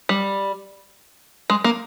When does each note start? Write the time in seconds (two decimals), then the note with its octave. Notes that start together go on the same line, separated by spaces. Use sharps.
0.09 G3
1.50 G#3
1.64 A#3